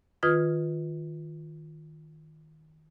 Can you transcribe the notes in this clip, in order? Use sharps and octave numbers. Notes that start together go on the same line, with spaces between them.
D#3 F4 B4 D#6 F6 G#6